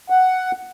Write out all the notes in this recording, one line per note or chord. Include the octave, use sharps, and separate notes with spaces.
F#5